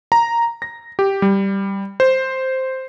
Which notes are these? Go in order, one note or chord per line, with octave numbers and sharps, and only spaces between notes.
A#5
A#6
G4
G3
C5